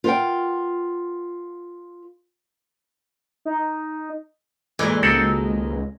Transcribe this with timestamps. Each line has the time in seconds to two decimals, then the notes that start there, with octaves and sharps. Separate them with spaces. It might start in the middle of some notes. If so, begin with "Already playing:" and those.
0.04 F4 A#4 C5 F#5 G5
3.45 D#4
4.79 F2 A#2 E3 G#3
5.03 C#2 D#3 A#3 C4 F#4 A4 F#5